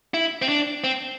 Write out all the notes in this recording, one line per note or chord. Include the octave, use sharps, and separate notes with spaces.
E4
C4
D4
C4